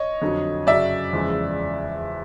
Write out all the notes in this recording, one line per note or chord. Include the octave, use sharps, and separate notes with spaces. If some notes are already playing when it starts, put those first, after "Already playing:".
Already playing: C#5 D#5
F2 D3 F#3
F#2 C#3 F#3 D5 E5
E2 C#3 F3 G#3